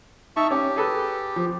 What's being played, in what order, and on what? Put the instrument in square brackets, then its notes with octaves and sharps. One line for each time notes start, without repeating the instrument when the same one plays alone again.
[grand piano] D#4 [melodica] E5 A5 C#6
[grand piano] C#4 [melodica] G4
[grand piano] G#4 A4 B4
F3